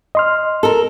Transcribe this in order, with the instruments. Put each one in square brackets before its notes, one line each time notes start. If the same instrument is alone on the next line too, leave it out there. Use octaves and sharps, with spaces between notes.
[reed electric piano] D#5 C6 F6
[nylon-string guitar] A4 A#4